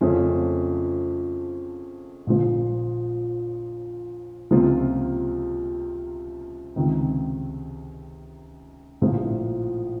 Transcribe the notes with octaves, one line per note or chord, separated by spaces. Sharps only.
F2 C#3 F3 A3 C#4
A#1 A#2 F3
C#2 C3 F3 A#3 F4
C#2 C3 D#3
A#1 A2 F3 A#3